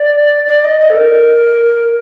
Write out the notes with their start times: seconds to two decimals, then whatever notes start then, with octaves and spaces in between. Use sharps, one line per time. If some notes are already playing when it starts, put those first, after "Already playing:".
Already playing: D5
0.48 D5
0.64 D#5
0.81 D#5
0.90 A4
0.97 A#4